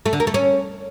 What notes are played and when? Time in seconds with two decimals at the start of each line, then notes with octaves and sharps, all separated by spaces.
0.06 A3
0.13 D3
0.20 A#3
0.27 A3
0.34 C#4